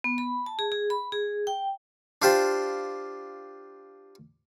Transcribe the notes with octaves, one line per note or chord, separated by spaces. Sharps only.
B3
B5
A5
G#4
G#4
B5
G#4
G5
D4 F4 G4 C5